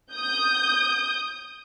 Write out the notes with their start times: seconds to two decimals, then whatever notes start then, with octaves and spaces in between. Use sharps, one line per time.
0.13 D#6 G6